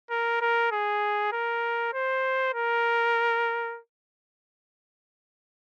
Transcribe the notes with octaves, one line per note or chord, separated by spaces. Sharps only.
A#4
A#4
G#4
A#4
C5
A#4